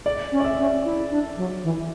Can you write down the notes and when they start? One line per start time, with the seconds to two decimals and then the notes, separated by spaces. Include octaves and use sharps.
0.06 D5
0.32 C#4
0.40 D5
0.45 E5
0.58 C#4
0.85 E4
1.11 D4
1.37 F#3
1.64 E3